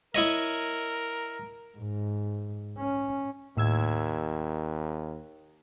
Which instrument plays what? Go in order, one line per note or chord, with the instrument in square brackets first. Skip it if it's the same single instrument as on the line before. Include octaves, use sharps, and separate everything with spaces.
[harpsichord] E4 C#5 D#5 [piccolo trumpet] A#4
[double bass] G#2
C#4
[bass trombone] D#2 [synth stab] A2 E6 G#6